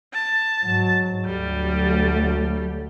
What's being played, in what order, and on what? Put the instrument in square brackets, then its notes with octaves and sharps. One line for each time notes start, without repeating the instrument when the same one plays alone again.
[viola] A5
[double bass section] G#2 F#3
[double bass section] D2 F#3 A3 [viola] G3